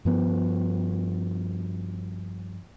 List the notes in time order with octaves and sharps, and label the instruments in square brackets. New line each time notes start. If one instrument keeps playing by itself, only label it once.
[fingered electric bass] G2 F3 B3